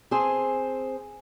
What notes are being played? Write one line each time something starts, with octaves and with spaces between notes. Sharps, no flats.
C4 G#4 C5 G#5 A5